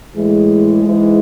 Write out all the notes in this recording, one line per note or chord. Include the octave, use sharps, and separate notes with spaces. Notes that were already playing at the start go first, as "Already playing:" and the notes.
A2 E3 G#3
G#2 E3